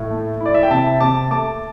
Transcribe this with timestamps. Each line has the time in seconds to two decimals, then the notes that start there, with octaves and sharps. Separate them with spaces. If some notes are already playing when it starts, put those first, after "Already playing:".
Already playing: A2
0.11 A3
0.41 E4
0.46 D5
0.54 E5
0.63 G5
0.71 C3 E5 A5
1.00 C3 A5 D6
1.31 A3 A5 D6